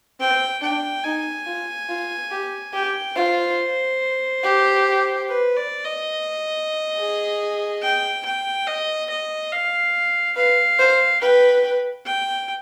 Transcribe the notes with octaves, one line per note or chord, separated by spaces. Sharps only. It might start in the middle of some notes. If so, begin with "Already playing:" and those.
C4 G5
D4 G5
D#4 G#5
F4
F4
G4
G4 G5
F4 C5
G4
B4
D5
D#5
G#4
G5
G5
D#5
D#5
F5
B4 F5
C5
B4 G5
G5